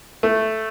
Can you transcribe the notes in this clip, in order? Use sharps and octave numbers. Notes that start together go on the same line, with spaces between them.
A3